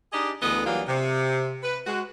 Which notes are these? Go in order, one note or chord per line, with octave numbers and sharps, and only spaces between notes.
D4 D#4 G4 G#4 D5 D#5
D2 D3 E3 B3 G#4 D#5
E3 F#3 G3 A#3 D4 F4
C3
B4
G#3 F#4